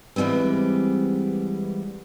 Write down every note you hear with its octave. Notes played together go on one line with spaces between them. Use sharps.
E3 G3 G#3 B3 C4